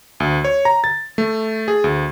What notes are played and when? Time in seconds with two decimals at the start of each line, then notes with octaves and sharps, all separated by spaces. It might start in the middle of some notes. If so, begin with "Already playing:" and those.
0.20 D2
0.44 C#5
0.65 A#5
0.84 A6
1.18 A3
1.68 G#4
1.84 D2